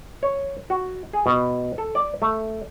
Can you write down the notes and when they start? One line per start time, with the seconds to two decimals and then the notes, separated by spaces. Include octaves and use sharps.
0.23 C#5
0.70 F#4
1.13 G#4
1.26 B2
1.78 A4
1.95 D5
2.22 A3